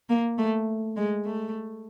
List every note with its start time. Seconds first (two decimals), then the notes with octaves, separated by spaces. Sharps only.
0.09 A#3
0.38 A3
0.97 G#3
1.25 A3